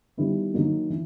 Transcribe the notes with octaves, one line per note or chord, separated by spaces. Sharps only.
D#3 G3 B3 E4
D#3 F#3 A#3
E3